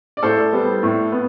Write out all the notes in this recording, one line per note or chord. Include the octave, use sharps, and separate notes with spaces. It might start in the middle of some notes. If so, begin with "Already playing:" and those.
D5
A2 A4 C5
G3 B3
A2
B3